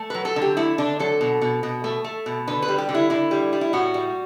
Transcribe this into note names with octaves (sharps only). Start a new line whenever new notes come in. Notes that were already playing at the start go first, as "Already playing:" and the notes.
Already playing: A3
F#3 B4
A4
D3
G4
A3 E4
D3 D4
F#3 A4
B2
B2
B2
A3
A3
B2
D3 B4
B4
G3
G4
D3
E4
D3 E4
G3
G3
E4
A2 F#4
G3